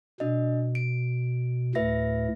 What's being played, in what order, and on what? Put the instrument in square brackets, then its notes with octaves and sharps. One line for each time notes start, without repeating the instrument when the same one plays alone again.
[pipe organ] B2 [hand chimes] D4 D#5
[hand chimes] D7
[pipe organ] D2 A2 [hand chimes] B4 E5 A#6